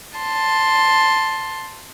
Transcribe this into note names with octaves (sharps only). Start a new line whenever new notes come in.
A5 C6